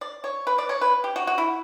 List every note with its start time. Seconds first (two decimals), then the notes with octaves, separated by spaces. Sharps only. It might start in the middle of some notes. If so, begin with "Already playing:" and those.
0.01 D5
0.24 C#5
0.47 B4
0.58 D5
0.69 C#5
0.81 B4
1.04 G4
1.16 F#4
1.27 F#4
1.38 E4